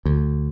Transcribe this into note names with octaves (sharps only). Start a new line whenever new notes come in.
D2